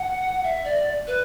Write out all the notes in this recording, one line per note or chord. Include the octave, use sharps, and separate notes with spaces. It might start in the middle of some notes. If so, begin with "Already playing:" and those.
Already playing: F#5
E5
D5
B4